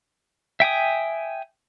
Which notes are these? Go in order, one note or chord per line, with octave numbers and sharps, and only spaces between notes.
E5 G5 G#5 D#6